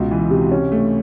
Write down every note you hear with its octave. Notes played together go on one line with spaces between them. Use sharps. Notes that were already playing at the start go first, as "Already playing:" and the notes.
Already playing: C#2 B2
E3
C3
C#4
A3